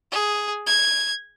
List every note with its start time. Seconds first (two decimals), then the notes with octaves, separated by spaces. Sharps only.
0.12 G#4
0.67 G#6